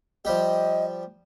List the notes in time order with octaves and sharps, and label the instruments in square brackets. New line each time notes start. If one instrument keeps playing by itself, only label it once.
[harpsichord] F3 G3 G4 [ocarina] D#5